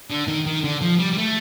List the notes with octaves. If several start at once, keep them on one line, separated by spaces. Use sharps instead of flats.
D3
D#3
D#3
D3
F3
G3
G3
A3